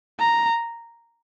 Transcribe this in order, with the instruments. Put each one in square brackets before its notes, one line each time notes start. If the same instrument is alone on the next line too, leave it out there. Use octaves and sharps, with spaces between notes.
[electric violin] A#5